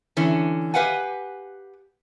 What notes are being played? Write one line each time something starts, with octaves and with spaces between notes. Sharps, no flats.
D3 E3 C#4
G4 B4 F5 F#5 G#5